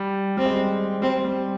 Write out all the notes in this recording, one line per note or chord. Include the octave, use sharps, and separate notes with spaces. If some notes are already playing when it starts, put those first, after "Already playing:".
Already playing: G3
G3 C4
G#3
G3
G3 C4
G3